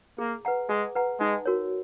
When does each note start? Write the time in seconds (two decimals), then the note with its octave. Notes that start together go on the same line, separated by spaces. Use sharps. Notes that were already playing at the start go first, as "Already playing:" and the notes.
0.18 A#3 G#4
0.45 B4 F#5 A#5
0.69 G#3 G#4
0.96 B4 F#5 A#5
1.20 G#3 D#4
1.45 F#4 A#4 C#5